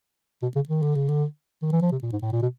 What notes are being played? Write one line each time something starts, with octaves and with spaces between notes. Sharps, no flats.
B2
C#3
D#3
D3
C#3
D3
D#3
E3
F3
C3
A#2
G#2
A2
A#2
B2